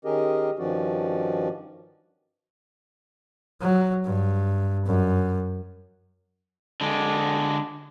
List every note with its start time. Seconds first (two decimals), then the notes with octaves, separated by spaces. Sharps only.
0.05 D#3 C#4 G4 G#4 A#4 D#5
0.59 G2 D#3 F3 C#4 F#4 D5
3.61 F#3
4.05 G2
4.86 F#2
6.81 D3 G#3